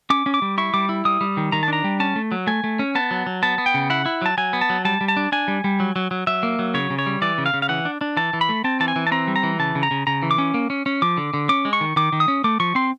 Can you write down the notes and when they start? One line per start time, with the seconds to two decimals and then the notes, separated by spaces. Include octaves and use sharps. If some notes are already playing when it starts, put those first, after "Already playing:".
0.10 C#4 D6
0.26 C#4
0.34 D6
0.42 G3
0.58 E4 C#6
0.74 G3 D6
0.89 E4
1.05 G3 D#6
1.21 G3
1.37 D#3
1.52 D#3 A#5
1.63 A5
1.68 D4 A#5
1.84 G3
2.00 C#4 A5
2.16 A3
2.32 F#3
2.47 A3 G#5
2.64 A3
2.79 C#4
2.95 B3 A5
3.11 F#3
3.26 F#3
3.43 B3 A5
3.58 B3
3.66 G5
3.74 C#3
3.90 E4 F#5
4.06 E4
4.22 F#3 A5
4.38 F#3 G#5
4.53 B3
4.61 A5
4.70 F#3
4.85 G3 A5
5.01 G3
5.08 A5
5.17 D4
5.32 D4 G#5
5.48 G3
5.64 G3
5.80 F#3
5.96 F#3
6.11 F#3
6.27 F#3 E5
6.43 A#3
6.59 F#3
6.74 C#3 C#5
6.90 C#3
6.99 C#5
7.06 G3
7.22 E3 D5
7.38 C#3
7.46 F5
7.54 C#3
7.62 F5
7.69 E3 F#5
7.85 D4
8.01 D4
8.17 E3 A5
8.33 E3
8.41 B5
8.49 A3
8.64 C4 A5
8.80 E3 A5
8.88 G#5
8.96 E3
9.07 A5
9.12 C4 A#5
9.28 G3
9.36 A#5
9.43 E3
9.59 C#3 A5
9.75 C#3
9.83 A#5
9.91 C#3
10.07 C#3 A#5
10.23 E3
10.31 D6
10.38 C#4
10.54 A#3
10.70 C#4
10.86 C#4
11.02 F3 D6
11.17 D3
11.34 D3
11.49 C#4 D6
11.65 G#3
11.73 C#6
11.81 D#3
11.96 D#3 D6
12.12 D#3
12.20 D#6
12.28 C#4
12.44 A3 D6
12.60 F3 C#6
12.75 C4 C6